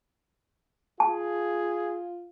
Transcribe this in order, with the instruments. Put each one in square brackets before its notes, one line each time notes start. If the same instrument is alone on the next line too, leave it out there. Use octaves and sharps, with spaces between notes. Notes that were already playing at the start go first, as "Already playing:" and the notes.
[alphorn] F4 [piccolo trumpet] G#4 [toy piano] A5